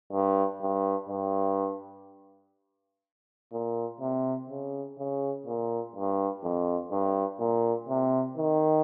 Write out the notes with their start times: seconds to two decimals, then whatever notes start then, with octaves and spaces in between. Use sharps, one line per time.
0.12 G2
0.62 G2
1.09 G2
3.52 A#2
4.00 C3
4.49 C#3
4.98 C#3
5.46 A#2
5.95 G2
6.43 F2
6.91 G2
7.40 A#2
7.89 C3
8.37 D#3